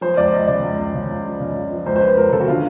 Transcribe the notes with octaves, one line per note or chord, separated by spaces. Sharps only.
F3 C5
C#2 D5
C#2 D#5
C#3 D5
C#2
C#2
C#3
C#2
F3
C#3
F3
F3
C#2 C5
C5
F3 B4
C#2 A#4
C#3 A4
F#4
D3 F4